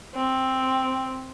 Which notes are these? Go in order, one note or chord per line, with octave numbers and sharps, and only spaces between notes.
C4